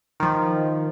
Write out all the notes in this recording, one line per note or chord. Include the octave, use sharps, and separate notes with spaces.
D#3 F3